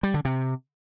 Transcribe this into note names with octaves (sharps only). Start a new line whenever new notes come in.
G3
D3
C3